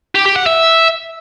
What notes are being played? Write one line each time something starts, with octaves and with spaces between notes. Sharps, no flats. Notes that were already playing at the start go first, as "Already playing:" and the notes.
G4
G4
F#5
E5